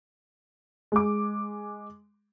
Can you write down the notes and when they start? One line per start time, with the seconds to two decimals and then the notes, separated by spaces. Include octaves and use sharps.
0.92 G#3 D6